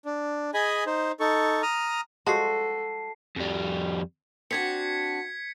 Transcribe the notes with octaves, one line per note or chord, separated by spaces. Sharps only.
D4
G#4 D#5 G#5 B5
D#4 C5
D#4 A4 C#6
A#5 D#6 F6
F3 G3 G#3 F#4 A4 A5 C7
F2 G3
C4 D4 F#4 G#6 B6 C#7